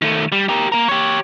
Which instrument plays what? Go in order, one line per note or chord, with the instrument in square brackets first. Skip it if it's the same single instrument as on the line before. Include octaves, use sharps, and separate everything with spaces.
[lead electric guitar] D#3 A3
G3
G4 A#4
A#3 A#4
G4 C#5